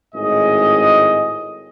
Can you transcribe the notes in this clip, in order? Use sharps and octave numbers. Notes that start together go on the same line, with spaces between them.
G#1 A2 G#4 D#5